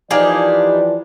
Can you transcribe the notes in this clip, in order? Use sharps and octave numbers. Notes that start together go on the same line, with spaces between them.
E3 F3 A#3 D4 D#4 G4 G#4 D5